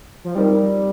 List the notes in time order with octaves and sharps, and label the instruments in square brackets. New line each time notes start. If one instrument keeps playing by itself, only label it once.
[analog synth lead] F3
[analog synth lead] G3 [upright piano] C4 D#4 A#4